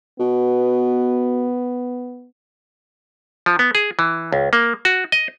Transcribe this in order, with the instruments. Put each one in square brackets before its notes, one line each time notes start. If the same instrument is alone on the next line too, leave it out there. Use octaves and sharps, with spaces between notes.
[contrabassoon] B2 [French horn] B3
[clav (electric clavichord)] F3
B3
G#4
E3
C#2
A#3
F#4
D#5